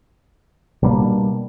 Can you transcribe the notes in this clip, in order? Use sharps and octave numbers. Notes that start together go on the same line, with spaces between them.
B2 G3 A#3 D4